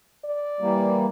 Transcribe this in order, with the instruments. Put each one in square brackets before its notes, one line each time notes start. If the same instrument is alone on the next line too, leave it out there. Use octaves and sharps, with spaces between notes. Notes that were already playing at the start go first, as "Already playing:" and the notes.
[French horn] D5
[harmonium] E3 G3 A#3